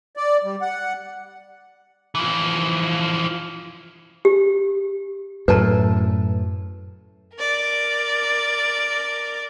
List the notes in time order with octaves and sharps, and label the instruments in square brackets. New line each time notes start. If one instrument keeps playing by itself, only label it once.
[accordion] D5
G3
F#5
[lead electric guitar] E3 F3
[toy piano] G4
[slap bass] F#2 A2 [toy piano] B4 A5
[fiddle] A#4 D5